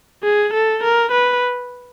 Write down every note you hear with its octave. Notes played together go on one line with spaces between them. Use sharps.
G#4
A4
A#4
B4